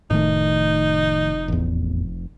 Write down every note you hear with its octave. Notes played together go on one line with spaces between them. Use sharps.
F1 A2 D#3 A3 D#4
A1 E2